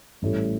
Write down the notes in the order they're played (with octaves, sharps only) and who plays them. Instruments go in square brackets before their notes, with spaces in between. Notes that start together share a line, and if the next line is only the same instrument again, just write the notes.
[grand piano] A1 A2 G3